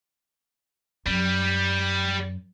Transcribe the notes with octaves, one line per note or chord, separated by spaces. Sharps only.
F#2 G3